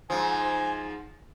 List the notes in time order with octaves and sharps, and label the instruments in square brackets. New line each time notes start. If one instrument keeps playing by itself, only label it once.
[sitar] G#2 F3 [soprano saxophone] G#5